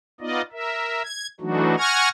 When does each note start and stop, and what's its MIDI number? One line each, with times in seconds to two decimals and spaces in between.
0.20 0.42 59
0.20 0.42 63
0.20 0.42 65
0.20 0.42 74
0.20 0.42 75
0.52 1.02 70
0.52 1.02 76
1.04 1.27 92
1.40 1.75 52
1.40 1.75 54
1.40 1.75 57
1.40 1.75 62
1.40 1.75 63
1.40 1.75 66
1.78 2.09 78
1.78 2.09 80
1.78 2.09 85
1.78 2.09 89
1.78 2.09 92
1.78 2.09 94